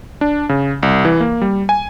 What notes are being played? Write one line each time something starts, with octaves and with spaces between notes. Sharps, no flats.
D4
C#3
C2
E3
A#3
G3
G#5